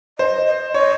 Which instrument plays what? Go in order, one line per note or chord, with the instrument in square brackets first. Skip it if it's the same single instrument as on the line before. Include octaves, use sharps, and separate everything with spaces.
[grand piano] C5 [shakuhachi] D#5
[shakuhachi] D#5
[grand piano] C#5 [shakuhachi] D#5